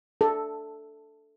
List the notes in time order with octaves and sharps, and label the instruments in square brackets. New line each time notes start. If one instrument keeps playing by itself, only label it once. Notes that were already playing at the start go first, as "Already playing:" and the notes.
[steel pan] A4